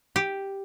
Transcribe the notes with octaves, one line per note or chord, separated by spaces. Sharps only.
G4